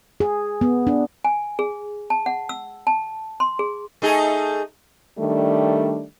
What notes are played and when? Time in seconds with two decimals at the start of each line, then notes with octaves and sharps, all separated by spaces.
0.20 G#4
0.61 B3
0.87 D4
1.25 G#5
1.59 G#4
2.10 A5
2.26 F#5
2.49 E6
2.87 A5
3.40 C6
3.59 G#4
4.02 A3 D#4 G#4
5.17 D#3 G3 A3 D4